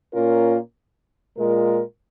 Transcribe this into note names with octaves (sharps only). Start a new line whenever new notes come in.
A#2 A#3 C#4 F4 A#4
A#2 G#3 F4 A#4